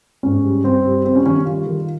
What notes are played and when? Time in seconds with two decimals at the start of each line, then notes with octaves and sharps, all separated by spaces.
0.23 G#2 C#4
0.44 G3
0.64 G2 C4
0.85 G3
1.05 G3 C4
1.15 C#4
1.26 D#3 C#4
1.45 G3 F4
1.66 D#3